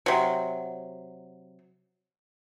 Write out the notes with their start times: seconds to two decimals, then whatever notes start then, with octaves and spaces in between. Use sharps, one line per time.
0.06 C3 F#3